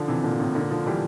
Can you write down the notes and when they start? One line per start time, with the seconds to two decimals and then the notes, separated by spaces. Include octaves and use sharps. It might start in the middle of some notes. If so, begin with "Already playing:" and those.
Already playing: D3 F3
0.08 C3 E3
0.24 A#2 D3
0.39 A2 C3
0.55 A#2 D3
0.71 D3 F3
0.86 E3 G3